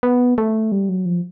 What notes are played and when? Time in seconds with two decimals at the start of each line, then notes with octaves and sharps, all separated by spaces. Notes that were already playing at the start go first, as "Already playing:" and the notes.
0.03 B3
0.38 A3
0.72 G3
0.89 F#3
1.06 F3